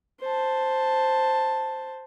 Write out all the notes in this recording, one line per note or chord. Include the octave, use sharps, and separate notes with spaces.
C5 A5